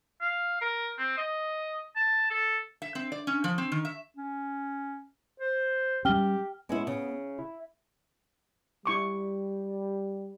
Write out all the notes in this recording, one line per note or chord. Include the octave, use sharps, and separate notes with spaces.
F5
A#4
C4
D#5
A5
A4
E5
C4
D5
C#4
F3
C4
D#3
E5
C#4
C5
G3 B3 C#4 G4 G5 F6 G7
G#3 B3 C#4 E4
C#3
E4
G3 E4 C#6 D6